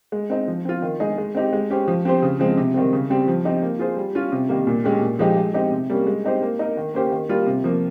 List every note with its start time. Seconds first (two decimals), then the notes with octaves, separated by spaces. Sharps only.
0.12 G#3
0.30 C4 D#4
0.48 F3
0.65 C4 F4
0.82 D#3
1.00 G#3 D#4 G#4
1.18 G#3
1.35 C4 D#4 G4
1.53 G#3
1.70 C#4 G4 C5
1.88 F3
2.05 C4 G4 C5
2.22 C#3
2.39 F3 G#3 C4
2.57 C3
2.74 D#3 G3 C4
2.93 C#3
3.10 G3 C4 G4 C5
3.28 F3
3.44 C4 D#4 G4
3.62 A#3
3.79 F4 G#4 C5
3.97 G3
4.15 C#4 F4
4.32 C3
4.49 D#3 G3 A#3
4.67 A#2
4.84 G#3 C#4 G4
5.01 A#2
5.19 F3 G#3 D#4 G4
5.37 G#3
5.54 C4 D#4 G4
5.71 C3
5.90 G3 A#3 C#4
6.07 G#3
6.24 C4 D#4 G4 C5
6.42 A#3
6.59 D#4 A#4
6.77 D#3
6.94 A#3 C#4 G4 C5
7.12 D#3
7.29 G3 A#3 F4
7.46 C3
7.64 F3 A#3